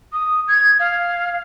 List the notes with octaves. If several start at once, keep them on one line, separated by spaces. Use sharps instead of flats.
D#6
G#6
F5